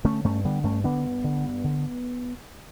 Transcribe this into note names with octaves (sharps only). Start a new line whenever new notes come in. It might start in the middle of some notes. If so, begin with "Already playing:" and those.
D3 A3 C#4
G2 A3 C#4
D3 G3 B3
G2 A3 C#4
D3 B3 D4
G2
D3
G2
D3